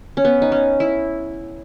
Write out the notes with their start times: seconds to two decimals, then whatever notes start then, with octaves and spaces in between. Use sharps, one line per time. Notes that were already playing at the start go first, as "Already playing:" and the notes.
0.17 C#4
0.25 B3
0.42 D#4
0.52 C#4
0.80 E4